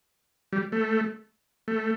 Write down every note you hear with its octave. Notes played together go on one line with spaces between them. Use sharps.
G3
A3
A3